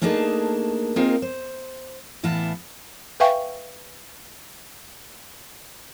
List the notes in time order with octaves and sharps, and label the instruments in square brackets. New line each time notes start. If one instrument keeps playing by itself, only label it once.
[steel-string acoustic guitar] A3 A#3 D4 D#4 G#4 A5
A#3 C4 D#4 F4 G#4 A#4
C5
A2 E3 B3 E4 F5 A5
[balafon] B4 E5 F5 G5 G#5 C#6